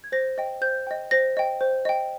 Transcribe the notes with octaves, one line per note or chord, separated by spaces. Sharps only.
G#6
C5 A#6
D#5 G5
C5 G6
D#5 G5
C5 A#6
D#5 G5
C5
D#5 G5